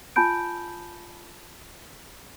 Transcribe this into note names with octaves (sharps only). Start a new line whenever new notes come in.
F4 G#5 A5 B5 G6 D7